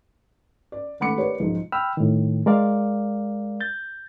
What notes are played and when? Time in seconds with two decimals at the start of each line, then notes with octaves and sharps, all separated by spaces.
0.72 D5
1.00 G#1 A3 F#5 B5 D6 C#7
1.17 G4 A#4 B4 C#5 D5
1.40 B1 G#2 F3 G#3
1.72 G5 B5 E6 F6
1.97 A2 D#3
2.46 G#3 A#4 D5 F5
3.60 G6 A6